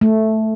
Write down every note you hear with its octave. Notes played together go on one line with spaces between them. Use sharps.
A3